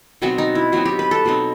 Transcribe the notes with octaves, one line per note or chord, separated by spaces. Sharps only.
B2 F#3 C4 D#4 F#4
D#4
E4
B2 F#3 C4 D#4 F#4
G4
B4
A4
B2 F#3 C4 D#4